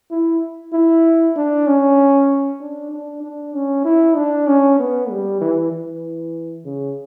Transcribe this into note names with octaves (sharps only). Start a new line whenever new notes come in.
E4
E4
D4
C#4
D4
D4
D4
C#4
E4
D4
C#4
B3
G3
E3
E3
C#3